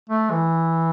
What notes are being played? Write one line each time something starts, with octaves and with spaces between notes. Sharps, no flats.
A3
E3